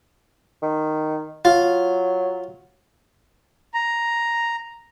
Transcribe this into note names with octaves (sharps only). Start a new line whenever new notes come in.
D#3
F#3 F4
A#5